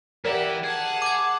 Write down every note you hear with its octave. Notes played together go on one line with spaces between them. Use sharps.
E3 G4 A#4 D5 E5 F#5
G#4 F#5 A5
D6 G#6